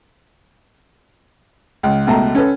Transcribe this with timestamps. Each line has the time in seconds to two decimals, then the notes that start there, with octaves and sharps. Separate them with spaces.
1.83 C#2
2.07 C#2 B2 A3 A#5
2.35 C#4 A4 B4